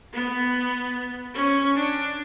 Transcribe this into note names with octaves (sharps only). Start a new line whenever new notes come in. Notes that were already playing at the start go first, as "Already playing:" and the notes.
B3
C#4
D4